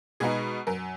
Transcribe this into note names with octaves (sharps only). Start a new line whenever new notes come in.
B2 G#3 B3 D#4 G#4
F#2 A#4